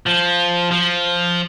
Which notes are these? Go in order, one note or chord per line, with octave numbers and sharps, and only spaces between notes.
F3
F3